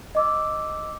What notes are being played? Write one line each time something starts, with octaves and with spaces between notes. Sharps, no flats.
D#5 D6 E6